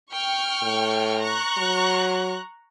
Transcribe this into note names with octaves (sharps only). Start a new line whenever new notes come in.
G5 C#6 F6
A2
A#5 C#6 F#6
F#3